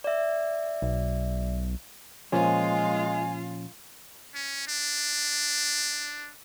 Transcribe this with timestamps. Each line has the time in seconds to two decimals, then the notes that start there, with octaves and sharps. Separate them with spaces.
0.04 D5 E5
0.82 B1
2.32 A#2 F3 G#3 C#4 F4 F5 G#5
4.35 C#4
4.68 D4